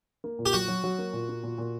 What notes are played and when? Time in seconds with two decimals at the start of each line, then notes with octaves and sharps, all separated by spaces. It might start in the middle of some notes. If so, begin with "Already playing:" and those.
0.24 A#3
0.39 A#2
0.46 G4
0.53 F#3 F#4
0.68 F#3
0.84 F#3
0.99 A#3
1.13 A#2
1.29 A#3
1.44 A#2
1.58 A#2